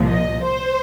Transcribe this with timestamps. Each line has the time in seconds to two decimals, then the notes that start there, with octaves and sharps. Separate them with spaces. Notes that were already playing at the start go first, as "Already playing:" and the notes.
Already playing: C2 A#2 F3
0.09 D#5
0.43 C5